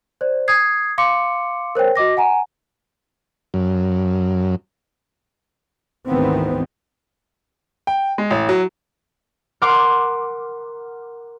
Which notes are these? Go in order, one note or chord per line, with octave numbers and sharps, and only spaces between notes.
C5 D5
D#6 G#6 C7
F5 C6 D6 C#7
A#4 C5 C#5 G5
F#4 D#5 D6 A#6
F#5 G#5 A#5
F#2
G#1 D2 D#3 E3 B3 C4
G5
G#3
A1
F#3
A#4 F#5 C6 D6 F6